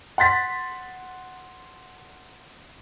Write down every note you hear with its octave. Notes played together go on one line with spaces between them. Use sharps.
F#5 C6 A6 B6